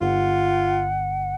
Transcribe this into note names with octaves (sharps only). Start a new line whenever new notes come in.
G1 F4 F#5